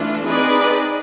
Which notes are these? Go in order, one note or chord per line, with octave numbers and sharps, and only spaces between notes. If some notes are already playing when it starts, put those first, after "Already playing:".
Already playing: E3 A3 D4 F4
C4 D#4 G#4 B4 D5